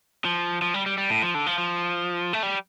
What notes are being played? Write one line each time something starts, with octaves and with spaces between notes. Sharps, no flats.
F3
F3
G3
G3
G3
A2
F3
D3
F3
F3
A3
G3